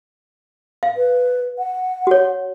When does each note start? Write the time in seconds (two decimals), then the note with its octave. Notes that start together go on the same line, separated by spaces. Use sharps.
0.83 F5
0.97 B4
1.58 F#5
2.07 F#4 C#5